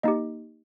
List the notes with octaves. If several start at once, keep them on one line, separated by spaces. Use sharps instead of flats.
A#3 D#4 G4 D#5